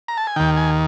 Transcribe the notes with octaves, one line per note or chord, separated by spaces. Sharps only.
A#5
A5
G#5
D#2 D#3 G5
G#5